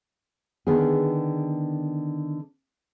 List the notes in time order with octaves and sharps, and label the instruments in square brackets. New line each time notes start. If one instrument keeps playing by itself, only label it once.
[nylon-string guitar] D3 D#3 B3 G#4